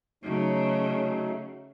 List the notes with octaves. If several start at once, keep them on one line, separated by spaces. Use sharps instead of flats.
C#3 F#3 A3 D#4